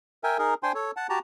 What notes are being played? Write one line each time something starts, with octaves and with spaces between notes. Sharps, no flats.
A#4 E5 G5 G#5
D#4 G#4 A#4
D4 C5 G5 G#5 C6
A4 C#5
F#5 A5
F#4 G4 A5 A#5